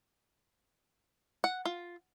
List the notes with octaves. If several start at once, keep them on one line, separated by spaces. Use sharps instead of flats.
F#5
F4